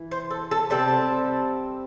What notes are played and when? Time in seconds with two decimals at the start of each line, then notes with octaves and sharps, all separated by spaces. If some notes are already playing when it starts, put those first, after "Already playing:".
Already playing: E3
0.11 C5
0.31 A4
0.51 A4
0.70 C3 G3 C4 A4